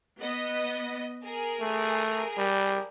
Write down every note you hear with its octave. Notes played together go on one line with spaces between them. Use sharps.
B3 D#5
G#4 A#4
A3
G3